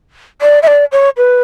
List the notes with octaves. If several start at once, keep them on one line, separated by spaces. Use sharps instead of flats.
D5
E5
D5
C#5
B4